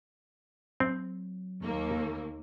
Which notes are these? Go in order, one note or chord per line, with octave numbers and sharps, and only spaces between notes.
F#3 C4
D#2 A#3